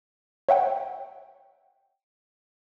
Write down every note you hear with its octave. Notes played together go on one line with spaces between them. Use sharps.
C#5 E5 F#5 G5